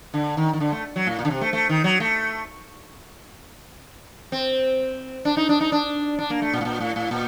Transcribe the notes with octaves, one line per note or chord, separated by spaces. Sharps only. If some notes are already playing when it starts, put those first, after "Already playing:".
D3
D#3
D#3
D3
A3
F#3
A2
A#2
D3
C3
A3
A3
D#3
F#3
A3
C4
D4
D#4
D4
D#4
D4
D4
A#3
A3
A#2
A2
A#2
A2
A2
A#2